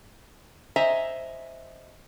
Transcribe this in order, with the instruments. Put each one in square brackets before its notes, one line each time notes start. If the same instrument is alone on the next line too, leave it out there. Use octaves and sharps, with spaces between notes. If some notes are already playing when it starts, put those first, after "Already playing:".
[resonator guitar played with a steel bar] C5 D#5 E5 G#5 A#5